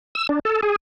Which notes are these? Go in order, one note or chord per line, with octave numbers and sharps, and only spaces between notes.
E6
D4
A4
G#4